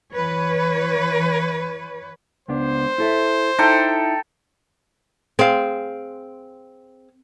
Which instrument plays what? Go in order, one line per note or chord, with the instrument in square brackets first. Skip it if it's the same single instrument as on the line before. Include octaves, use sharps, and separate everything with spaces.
[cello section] E3 B4 C#5
[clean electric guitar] C#2 B3 D4 [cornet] C5
[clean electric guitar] E4 A4 E5
[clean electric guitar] D#4 E4 [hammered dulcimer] A4 G5 A#5
[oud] C4 [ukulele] G#4 F5